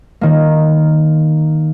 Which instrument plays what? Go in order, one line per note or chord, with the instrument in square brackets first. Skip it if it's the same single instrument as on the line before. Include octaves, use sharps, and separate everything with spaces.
[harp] D#3 A#3